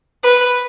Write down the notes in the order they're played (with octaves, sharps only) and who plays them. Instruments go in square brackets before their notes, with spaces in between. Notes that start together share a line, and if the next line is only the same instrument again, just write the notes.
[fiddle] B4